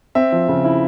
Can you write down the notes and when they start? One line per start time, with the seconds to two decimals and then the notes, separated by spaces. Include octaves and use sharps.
0.15 C4 E5
0.32 F3
0.49 C#3
0.65 E4